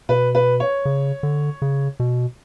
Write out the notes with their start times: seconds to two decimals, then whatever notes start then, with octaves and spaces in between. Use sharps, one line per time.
0.09 B2 B4
0.35 B4
0.60 C#5
0.85 C#3
1.23 D3
1.62 C#3
2.00 B2